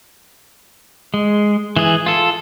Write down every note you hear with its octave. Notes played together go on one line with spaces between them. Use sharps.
G#3
E3 G#4
F4 A4